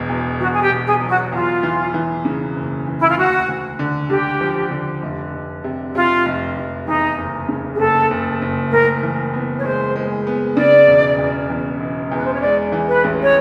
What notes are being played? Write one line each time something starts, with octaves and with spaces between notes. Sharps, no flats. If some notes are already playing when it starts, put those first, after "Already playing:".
Already playing: E1 B2
E2
E2 F#4
G#4
G4
B2
G#4
F#3
F#4
E2 F4
E3
E3
C#3
F#1
E3
E4
F4
D2 F#4
D2
D3
D3 G4
F3
D3
F1
F1
C3
C3 F4
F1
F1
E2 D#4
F#1
C#3
G#4
F#1 A4
F#1
F#1
A2 A#4
E3
B3
C#5
G#3 C5
G#3
B3
C#3 D5
E1
E2
E2
E1
E2
B4
C5
C#5
G#3 D5
E3
B4
A1
C#5